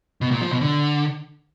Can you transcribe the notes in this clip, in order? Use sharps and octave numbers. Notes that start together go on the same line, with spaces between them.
B2
A#2
F3
B2
D3